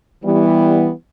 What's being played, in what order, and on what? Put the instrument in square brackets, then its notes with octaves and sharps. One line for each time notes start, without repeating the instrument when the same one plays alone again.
[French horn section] E3 G3 B3